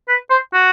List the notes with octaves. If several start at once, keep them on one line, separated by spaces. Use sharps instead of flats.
B4
C5
F#4